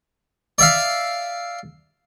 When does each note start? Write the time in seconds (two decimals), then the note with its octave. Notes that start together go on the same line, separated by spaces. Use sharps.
0.58 D5 E5 F5